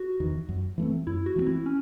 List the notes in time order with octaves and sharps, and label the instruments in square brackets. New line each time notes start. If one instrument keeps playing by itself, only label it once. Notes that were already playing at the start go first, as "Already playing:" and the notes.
Already playing: [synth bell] F#4
[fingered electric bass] E2 D#3
F#2
E3 A3 C4
[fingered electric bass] F#2 [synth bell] E4
[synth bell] F#4
[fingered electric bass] E3 A3 C4
[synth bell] E4
C#4